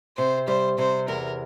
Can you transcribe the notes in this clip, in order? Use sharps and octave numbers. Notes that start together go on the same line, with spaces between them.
C3 C5
G3 C5
C3 C5
E2 A#4